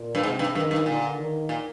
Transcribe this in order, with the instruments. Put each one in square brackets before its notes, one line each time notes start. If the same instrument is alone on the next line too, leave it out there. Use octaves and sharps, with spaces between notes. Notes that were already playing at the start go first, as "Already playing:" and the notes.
Already playing: [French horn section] A#2
[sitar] G2
[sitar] G#2 [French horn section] C3
[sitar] G2
[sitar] G2 [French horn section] D#3
[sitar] G2
[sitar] A#2 [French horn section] D3
[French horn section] D#3
[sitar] A#2